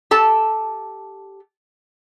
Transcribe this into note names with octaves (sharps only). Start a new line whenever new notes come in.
G4 A4 A5